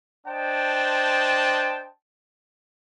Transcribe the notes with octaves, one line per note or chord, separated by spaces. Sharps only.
D4 C5 D#5 G5 A5